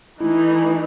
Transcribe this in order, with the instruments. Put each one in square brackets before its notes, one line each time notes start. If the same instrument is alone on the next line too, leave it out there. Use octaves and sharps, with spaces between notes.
[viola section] E3 A3 D#4 [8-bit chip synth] E4